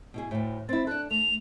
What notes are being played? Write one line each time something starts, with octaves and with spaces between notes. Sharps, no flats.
B2 E4 G#4
D2 A2
C4 E4 A6
D4 A4 F#6
A3 F7